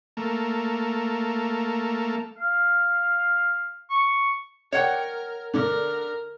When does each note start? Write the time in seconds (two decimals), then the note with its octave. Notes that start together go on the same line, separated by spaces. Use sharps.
0.17 A3 A#3
2.38 F5
3.90 C#6
4.72 A#4 C#5 F#5 G5
5.54 D3 A#4 D5